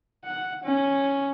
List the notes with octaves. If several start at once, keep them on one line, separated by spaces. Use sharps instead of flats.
F#5
C#4